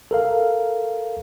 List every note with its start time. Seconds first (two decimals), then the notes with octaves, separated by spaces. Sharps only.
0.11 A4 A#4 F5